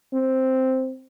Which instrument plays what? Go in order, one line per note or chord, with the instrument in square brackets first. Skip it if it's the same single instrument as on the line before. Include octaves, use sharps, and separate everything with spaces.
[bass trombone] C4